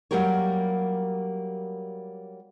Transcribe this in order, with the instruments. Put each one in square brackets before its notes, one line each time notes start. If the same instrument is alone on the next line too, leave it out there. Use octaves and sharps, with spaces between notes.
[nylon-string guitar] F#3 G3 A#3 G4 A#4 C#5